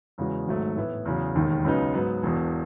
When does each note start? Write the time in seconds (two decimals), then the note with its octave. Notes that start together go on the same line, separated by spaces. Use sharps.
0.18 E2 C#3 G#3 B3 F#4
0.47 G#1 G#2 F#3 A3
0.77 A2 E3 B3 E4
1.05 E2 C#3 F#3
1.35 E1 D#2 D#3
1.65 C#2 C#3 F#3 B3 D#4
1.94 G#2 F#3 B3
2.23 E1 E2 B2